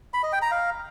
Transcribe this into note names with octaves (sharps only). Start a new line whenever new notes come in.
B5
D#5
G5
A#5
F5